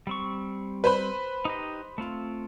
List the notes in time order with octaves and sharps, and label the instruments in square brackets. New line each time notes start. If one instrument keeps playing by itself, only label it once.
[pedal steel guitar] G3 C4 C#6
[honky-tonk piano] B4 C5 B5
[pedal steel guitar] D#4 G4 D#5
A3 C4 F4